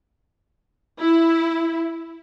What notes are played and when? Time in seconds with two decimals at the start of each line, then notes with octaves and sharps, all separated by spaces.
0.99 E4